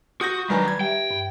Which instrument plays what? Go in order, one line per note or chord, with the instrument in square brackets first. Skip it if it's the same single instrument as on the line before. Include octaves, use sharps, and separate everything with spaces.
[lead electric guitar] F#4 [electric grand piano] D#6 G6 A#6
[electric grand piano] D#3 F#3 D4 [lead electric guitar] G3 [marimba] B4 G#5 A#5
[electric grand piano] G#6
[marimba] G4 E5 [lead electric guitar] G5
[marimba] G2